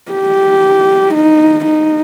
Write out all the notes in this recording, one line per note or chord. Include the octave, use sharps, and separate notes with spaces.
G4
D#4
D#4